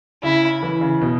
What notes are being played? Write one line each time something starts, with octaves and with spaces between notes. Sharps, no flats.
C#3 E4
E3
C#3
B2